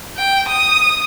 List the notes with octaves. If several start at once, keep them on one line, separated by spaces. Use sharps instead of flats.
G5
D#6